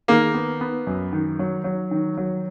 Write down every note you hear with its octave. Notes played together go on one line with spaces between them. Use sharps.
D#3 A#3
B3
B3
F#2
D#3
F#3
F#3
D#3
F#3